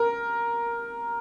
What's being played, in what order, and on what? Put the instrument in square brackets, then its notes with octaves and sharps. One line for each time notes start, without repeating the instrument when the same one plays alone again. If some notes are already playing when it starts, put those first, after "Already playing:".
Already playing: [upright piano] A#4